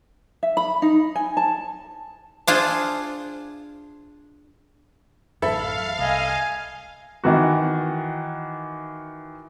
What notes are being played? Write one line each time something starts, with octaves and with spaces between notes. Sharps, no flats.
E5
B5
D#4
G#5
A5
D4 F4 G#4 C5
A1 F#2 A4 E5 F5 B5
C2 D#5 G#5
D#3 E3 F#4